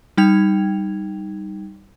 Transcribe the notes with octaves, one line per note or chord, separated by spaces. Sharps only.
G3 D#4 G5 G#6 F7